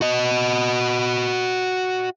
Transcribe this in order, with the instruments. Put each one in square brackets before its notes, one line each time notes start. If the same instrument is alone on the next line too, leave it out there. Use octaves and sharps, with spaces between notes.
[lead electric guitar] F#4 D#5